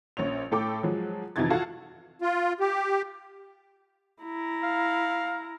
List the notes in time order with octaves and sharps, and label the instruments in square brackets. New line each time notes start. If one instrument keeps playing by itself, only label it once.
[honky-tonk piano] A#1 C#4 C#5 F7
A2 A4 G5 D6
F3 F#3 G#3
F2 C3 E3 D#4 G#6 A6
F4 F#4 A4 F5 F#5 A5
[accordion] F4
G4
[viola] E4 A#5
[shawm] F5